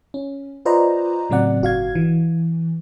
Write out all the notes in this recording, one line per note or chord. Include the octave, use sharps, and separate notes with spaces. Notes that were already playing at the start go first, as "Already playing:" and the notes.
C#4
F4 B4 C5 D5 D#5 A#5
A2 C#3 F#3 C4 D5 F#5
G1 F#4 F5 G#6
E3